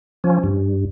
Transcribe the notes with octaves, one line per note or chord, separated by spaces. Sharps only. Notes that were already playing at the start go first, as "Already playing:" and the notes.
F3 C#4
G2